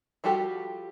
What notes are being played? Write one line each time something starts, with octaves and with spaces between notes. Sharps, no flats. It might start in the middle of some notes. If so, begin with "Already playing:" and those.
F3 G3 F#4 G4 A4